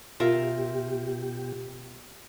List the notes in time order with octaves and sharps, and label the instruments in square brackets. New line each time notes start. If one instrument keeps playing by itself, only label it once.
[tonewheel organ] B2 G4 [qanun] F4 A#4 E5